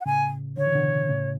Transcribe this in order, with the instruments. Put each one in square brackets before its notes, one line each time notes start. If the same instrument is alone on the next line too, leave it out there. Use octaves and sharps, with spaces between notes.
[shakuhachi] F#5
[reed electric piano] A2 C#3 [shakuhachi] G#5
[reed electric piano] D3 [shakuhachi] C#5
[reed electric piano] E3
B2 D3
A2 C#3